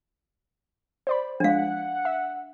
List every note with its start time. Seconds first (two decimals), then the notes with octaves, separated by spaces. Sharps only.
1.07 C5 D5 B5
1.40 F3 G#3 D4 F5 F#5
2.05 E5